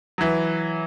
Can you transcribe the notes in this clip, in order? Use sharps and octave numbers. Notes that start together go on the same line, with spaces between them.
E3 F#3